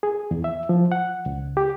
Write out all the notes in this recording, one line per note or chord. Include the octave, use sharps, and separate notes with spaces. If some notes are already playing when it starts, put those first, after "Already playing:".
G#4
E2
E5
F3
F#5
C#2
G4